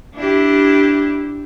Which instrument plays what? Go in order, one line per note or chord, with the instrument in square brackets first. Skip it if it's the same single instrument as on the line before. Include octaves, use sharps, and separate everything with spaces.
[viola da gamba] D4 E4 G4